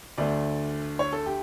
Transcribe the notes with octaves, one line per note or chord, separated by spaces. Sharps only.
D2 D3 A3 D5
C#5
A4
G4